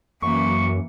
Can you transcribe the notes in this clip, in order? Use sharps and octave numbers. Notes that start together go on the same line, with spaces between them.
F#2 E3 A#3 C#6